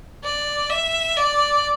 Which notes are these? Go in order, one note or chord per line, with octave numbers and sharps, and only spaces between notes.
D5
E5
D5